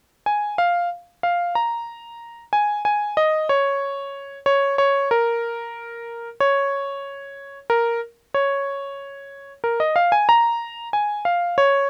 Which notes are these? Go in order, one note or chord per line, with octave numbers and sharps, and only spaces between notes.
G#5
F5
F5
A#5
G#5
G#5
D#5
C#5
C#5
C#5
A#4
C#5
A#4
C#5
A#4
D#5
F5
G#5
A#5
G#5
F5
C#5